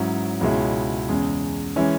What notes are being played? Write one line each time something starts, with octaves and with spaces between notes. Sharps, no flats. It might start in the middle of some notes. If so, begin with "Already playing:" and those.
Already playing: G#2 F#3 C#4 E4
C#2 B2 G#3 C#4 E4
E2 C#3 G#3
E3 G#3 C#4 E4